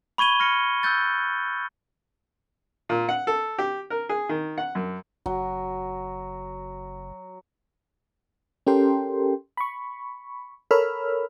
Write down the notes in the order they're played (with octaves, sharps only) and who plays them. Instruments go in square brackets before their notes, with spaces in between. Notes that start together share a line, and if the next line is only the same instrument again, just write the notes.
[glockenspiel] B5 C#6 G#6 D#7 G7
F6 A#6 C#7
C#6 E6 F#6 G6 A6
[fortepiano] A#2
F#5
A4
G4
A#4
G#4
D#3
F#5
F#2
[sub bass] F#1 [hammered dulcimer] F#3
[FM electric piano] C#4 G4 A4 A#4 G5 C6
B5 C#6
A4 A#4 C#5 B5 E6 F6